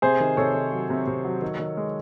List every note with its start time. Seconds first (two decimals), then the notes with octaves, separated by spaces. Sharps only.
0.02 C3 G#4 C5
0.20 D#3
0.37 C3 A4 C#5
0.55 D#3
0.72 F#3
0.90 C3
1.07 C3
1.25 F#3
1.42 D#3
1.60 D#3
1.77 G#3